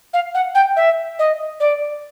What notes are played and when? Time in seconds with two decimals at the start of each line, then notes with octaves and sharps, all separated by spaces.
0.13 F5
0.34 F#5
0.55 G5
0.76 E5
1.19 D#5
1.60 D5